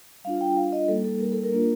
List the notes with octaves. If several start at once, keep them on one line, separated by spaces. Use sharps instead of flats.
G3 D4 F4 F5
G5
F5
D#5
G3 A#3 D#4 A4
A4
A#4
A4
A#4
A#3 D4 F4